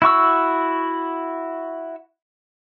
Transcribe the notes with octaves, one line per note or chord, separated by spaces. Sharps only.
E4 F#4 C#6 E6